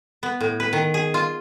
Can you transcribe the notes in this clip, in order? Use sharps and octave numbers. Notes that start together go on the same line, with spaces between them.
B3
A2
B4
D#3
G#4
F4